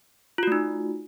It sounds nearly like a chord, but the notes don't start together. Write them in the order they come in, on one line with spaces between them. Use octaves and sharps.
F4 F#4 A3 D#4